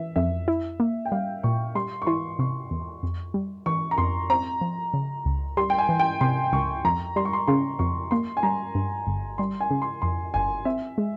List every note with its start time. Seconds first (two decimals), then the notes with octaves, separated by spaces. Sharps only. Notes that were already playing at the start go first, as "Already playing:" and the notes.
Already playing: E3 E5
0.16 F2 E5
0.48 E4
0.80 A#3
1.05 G5
1.12 G3 F5
1.43 A#2 C#6
1.75 G3 C6
2.02 C#6
2.07 E3 C6
2.39 C3 C#6
2.71 E2
3.03 F2
3.34 G3
3.66 E3 C#6
3.91 A#5
3.98 F2 C6
4.30 C4 A#5
4.61 F3
4.94 C#3
5.25 C#2
5.57 G3 C6
5.70 G5
5.78 G#5
5.89 E3
6.00 G5
6.21 C3 C6
6.52 C#2 C#6
6.85 F2 A#5
7.16 G3 C6
7.25 C#6
7.33 C6
7.47 C#3 C6
7.79 F2 C#6
8.11 A#3 C6
8.37 G#5
8.43 G3 A#5
8.75 G2
9.07 G1
9.38 G3 C6
9.60 G#5
9.71 C#3
9.82 C6
10.02 F2 C6
10.34 G1 G#5
10.65 C4 E5
10.98 G#3